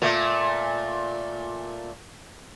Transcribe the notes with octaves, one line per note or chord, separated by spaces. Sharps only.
A#2 A3